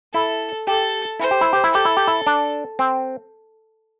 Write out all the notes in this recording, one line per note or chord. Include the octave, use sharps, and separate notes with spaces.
E4 A4
G4 A4
E4 C5
G4
E4
G4
E4
G4 A4
E4
G4
E4
D4
C4